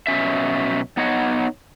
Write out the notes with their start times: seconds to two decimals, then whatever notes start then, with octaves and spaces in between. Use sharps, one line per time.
0.07 B2 F#3 C#4 E5
0.97 B3 D#4 C#5 D#5 F#5